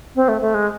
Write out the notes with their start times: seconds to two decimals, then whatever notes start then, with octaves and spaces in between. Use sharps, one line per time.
0.16 C4
0.28 A3
0.41 A3
0.54 G#3